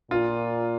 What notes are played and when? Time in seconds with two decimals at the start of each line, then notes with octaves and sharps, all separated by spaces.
0.11 A#2 F4